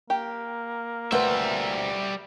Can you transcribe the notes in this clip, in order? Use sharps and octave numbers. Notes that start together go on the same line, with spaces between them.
A#3 G4
D2 G3 A3 B4 C5 E5 F#5